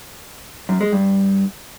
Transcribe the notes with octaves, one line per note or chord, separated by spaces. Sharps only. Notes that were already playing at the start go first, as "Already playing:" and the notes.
F#2
G#3
G2